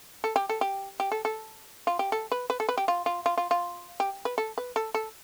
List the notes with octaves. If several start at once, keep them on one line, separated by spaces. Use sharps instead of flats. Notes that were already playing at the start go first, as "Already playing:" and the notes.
A4
G4
A4
G4
G4
A4
A4
F4
G4
A4
B4
B4
A4
B4
G4
F4
F4
F4
F4
F4
G4
B4
A4
B4
A4
A4